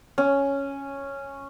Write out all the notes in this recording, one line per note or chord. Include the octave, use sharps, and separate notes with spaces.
C#4